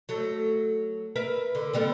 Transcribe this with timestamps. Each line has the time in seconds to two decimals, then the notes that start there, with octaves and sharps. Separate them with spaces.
0.09 F#3 A3
1.16 A#4 B4 E5
1.55 D3
1.74 D3 G3 B3